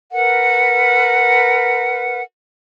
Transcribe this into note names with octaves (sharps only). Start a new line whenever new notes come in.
A#4 B4 F#5